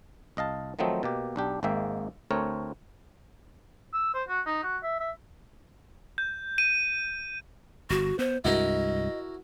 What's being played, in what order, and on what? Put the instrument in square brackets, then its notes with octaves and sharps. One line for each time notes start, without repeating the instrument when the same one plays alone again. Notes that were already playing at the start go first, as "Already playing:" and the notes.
[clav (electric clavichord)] C2 D#5 F5 A5
D#3 F3 F#3 A3 C4 D#4
B2 A#3 G4
B1 D4 G4
G#1 G#2 G#3 A#3 E5 G5
D2 A3 C4 A#4 C#5
[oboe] E6
C5
F#4
D#4
F#4
E5
E5
[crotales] G6
D#7
[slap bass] G1 [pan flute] F#4
[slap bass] B3 [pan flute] C5
[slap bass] C2 G2 G#3 [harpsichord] E4 F#4 A#4 [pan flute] D#5